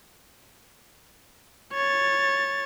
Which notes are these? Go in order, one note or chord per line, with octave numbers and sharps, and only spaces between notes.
C#5 A6